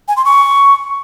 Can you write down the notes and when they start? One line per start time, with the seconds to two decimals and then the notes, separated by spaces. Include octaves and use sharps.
0.08 G#5
0.17 C6
0.25 C#6